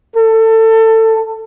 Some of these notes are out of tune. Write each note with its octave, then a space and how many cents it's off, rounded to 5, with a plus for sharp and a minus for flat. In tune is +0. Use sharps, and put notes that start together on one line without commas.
A4 +25